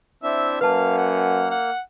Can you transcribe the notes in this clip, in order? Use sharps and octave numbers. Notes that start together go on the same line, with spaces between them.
C4 D4 E4 E5
F#2 A#3 B4 F5 A5 F6
F#5
F#5